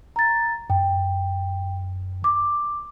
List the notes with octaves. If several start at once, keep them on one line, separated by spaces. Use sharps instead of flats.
A#5 A6
F#2 G5
D6